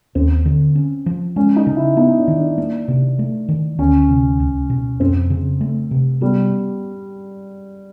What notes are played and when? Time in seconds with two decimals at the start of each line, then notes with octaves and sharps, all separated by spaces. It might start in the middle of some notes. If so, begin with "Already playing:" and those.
0.15 D#2 C4
0.46 D3
0.75 C#4
1.06 F3
1.36 G#3 C#4
1.56 D#4
1.67 C#3
1.76 E4
1.97 B3 D#4
2.17 D4
2.28 D#3
2.38 D4
2.58 A#3
2.88 C3
3.19 A3
3.49 D#3
3.79 D2 C#4
4.09 C3
4.40 C#2
4.70 B2
5.00 F2 C4
5.30 C#3
5.61 A3
5.91 C3
6.21 G3 B3